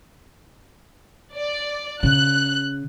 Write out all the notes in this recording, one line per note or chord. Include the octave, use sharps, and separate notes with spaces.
D5
C#3 F#6